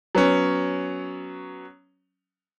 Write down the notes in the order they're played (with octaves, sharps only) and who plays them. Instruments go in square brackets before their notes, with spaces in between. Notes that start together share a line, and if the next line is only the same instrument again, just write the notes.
[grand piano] F#3 B3 C#4